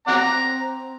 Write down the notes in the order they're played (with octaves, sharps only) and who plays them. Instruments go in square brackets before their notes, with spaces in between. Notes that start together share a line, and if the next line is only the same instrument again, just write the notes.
[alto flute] C4 [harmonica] D5 F#5 A#5